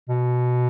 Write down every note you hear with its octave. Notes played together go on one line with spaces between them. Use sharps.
B2